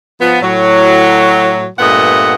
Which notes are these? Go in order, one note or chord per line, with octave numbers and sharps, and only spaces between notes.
F3 B3
A2 F#3
G2 A#2 A3 B3 D#5 F#5